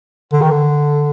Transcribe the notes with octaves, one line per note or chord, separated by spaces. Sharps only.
D3
D#3
D3